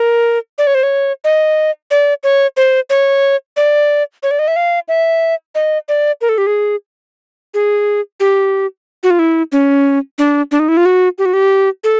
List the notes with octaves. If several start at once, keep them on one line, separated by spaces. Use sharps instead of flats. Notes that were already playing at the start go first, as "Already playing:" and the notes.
Already playing: A#4
D5
C#5
C5
C#5
D#5
D5
C#5
C5
C#5
D5
C#5
D5
D#5
E5
F5
E5
D#5
D5
A#4
A4
G4
G#4
G#4
G4
F#4
F4
E4
C#4
D4
D4
D#4
E4
F4
F#4
G4
F#4
G4
A4